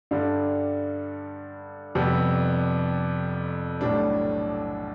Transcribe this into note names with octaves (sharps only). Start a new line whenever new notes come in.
G2 D3 G3
F2 C3 G3 B3
B1 A2 G3 D4